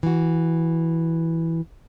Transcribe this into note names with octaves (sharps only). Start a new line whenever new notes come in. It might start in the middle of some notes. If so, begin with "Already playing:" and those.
E3 F#4